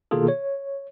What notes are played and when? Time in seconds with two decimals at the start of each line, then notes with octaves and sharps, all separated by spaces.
0.11 B2 D#3 A#3 F4 G#4 A4
0.28 C#5